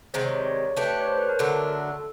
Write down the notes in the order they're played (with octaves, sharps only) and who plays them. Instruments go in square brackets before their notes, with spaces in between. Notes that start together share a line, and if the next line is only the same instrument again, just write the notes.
[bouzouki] C3 D#3 G#3 [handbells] C5
[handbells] C#5
D5
C#5
C#5
[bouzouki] A3 D4 G4 [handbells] B4
[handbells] C#5
C5
B4
A#4
[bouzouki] D3 F#3 A3 D4 [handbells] A4
[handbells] A4